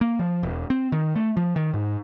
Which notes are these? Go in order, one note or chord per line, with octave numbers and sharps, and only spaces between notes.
A#3
F3
E1
C4
D#3
A3
F3
D#3
G#2